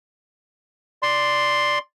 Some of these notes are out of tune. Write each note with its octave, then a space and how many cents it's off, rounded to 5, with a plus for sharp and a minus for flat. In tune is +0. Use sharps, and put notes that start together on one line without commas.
D5 +0 C6 +0